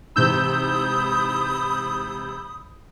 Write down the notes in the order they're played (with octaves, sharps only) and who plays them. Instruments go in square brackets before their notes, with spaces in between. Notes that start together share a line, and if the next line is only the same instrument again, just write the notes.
[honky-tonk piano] G#2 C3 E3 [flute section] B5 D#6 [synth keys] E6 G6